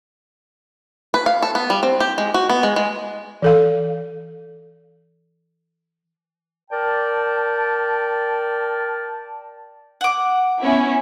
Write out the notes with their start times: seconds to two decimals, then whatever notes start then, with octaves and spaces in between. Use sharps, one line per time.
1.14 B4
1.26 F5
1.42 A4
1.55 B3
1.70 G3
1.83 C4
2.00 G4
2.18 G#3
2.34 F#4
2.49 B3
2.63 G#3
2.76 G#3
3.42 E3 A4 F5
6.71 A#4 D5 G5 A5
10.01 F#5 D6
10.61 B3 C#4 E4